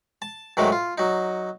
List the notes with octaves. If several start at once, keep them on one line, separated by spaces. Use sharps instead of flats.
A5
G#2 D#3 F#3 G#3 A3
F4
F#3 D#4